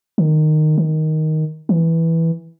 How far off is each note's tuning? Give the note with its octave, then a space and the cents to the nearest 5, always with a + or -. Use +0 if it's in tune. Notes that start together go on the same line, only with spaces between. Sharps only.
D#3 -15
D#3 +5
E3 -5